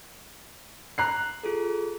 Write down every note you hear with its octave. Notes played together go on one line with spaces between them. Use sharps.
A#5 F#6 C7
F4 G#4 A4